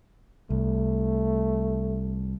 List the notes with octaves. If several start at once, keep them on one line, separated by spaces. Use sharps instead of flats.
C2 A3